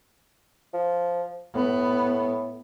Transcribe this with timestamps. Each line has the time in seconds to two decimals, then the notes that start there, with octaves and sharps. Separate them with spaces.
0.74 F3
1.55 A2 B3